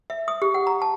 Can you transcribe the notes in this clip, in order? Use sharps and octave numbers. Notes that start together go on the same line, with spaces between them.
E5
D#6
G4
F#5
A#5
A5